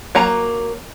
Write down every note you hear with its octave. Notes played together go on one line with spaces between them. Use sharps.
F#3 A#3 A#5